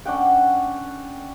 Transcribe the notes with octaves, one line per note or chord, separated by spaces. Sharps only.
C#4 D4 F#5 G5